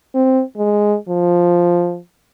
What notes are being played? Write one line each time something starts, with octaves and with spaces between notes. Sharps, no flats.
C4
G#3
F3